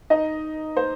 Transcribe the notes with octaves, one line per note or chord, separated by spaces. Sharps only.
D#4 D#5
C5